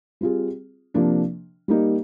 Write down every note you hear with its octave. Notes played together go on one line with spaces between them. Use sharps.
G3 C4 F4 G#4
C3 F3 A#3 D4
G3 A#3 D#4